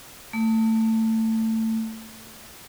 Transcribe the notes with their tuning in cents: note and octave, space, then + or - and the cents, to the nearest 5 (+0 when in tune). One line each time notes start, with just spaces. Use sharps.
A3 +20